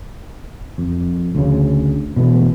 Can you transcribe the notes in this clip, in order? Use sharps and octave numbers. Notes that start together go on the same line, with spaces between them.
F2
D2 C#3
B2 E3 A3